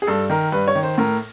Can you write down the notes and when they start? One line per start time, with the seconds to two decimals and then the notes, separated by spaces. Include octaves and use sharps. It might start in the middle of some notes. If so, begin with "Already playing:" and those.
0.02 G#4
0.07 G2 A4
0.30 D#3 A#4
0.52 G2 B4
0.67 C#5
0.75 D#3
0.83 C5
0.98 A2 A#4